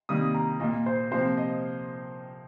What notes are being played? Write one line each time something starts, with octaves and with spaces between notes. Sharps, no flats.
C3 D#3 G3 A#3 D#6
A#5
A#2 A#3 D#5
C5
C3 F3 A#3 C5
D#5